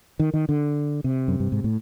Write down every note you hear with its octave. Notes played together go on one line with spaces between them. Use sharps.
D#3
D#3
D3
C3
F#2
G2
G#2
A2